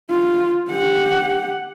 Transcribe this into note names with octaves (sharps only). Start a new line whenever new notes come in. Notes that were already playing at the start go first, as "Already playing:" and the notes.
F4
G4 F#5